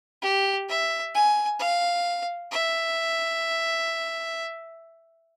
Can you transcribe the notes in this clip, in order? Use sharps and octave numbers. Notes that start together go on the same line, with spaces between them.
G4
E5
G#5
F5
E5